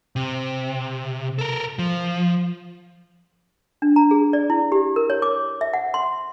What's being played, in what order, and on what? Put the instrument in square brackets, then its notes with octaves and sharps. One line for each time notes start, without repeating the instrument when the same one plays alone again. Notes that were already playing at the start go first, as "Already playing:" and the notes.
[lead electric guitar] C3
A4 A#4
F3
[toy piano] D4
A#5
G#4
D5
E4
G4
A#4
C#5
D6
E5
F#5
C6